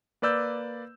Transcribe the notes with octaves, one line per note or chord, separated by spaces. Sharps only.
A#3 B4 D5 E6 G6